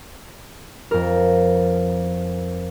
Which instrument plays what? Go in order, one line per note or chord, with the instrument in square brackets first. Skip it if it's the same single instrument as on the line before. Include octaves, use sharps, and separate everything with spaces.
[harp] F2 A#4